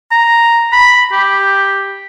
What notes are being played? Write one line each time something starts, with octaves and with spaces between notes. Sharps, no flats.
A#5
B5
G4